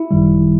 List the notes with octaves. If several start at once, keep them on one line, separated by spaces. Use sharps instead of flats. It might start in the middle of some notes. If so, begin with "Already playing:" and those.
Already playing: E4
G#1 F#2 D#3 G3